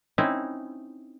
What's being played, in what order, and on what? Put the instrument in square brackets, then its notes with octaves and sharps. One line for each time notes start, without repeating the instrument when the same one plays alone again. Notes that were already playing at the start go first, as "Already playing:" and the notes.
[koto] C4 C#4 D#4 E4